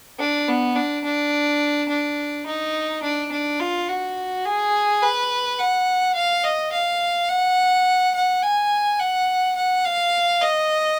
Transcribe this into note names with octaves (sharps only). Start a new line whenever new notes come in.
D4
B3
D4
D4
D4
D#4
D4
D4
F4
F#4
G#4
B4
F#5
F5
D#5
F5
F#5
F#5
G#5
F#5
F#5
F5
D#5